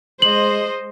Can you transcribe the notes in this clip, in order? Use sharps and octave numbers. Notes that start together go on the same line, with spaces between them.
G#3 C5 D#5 F#7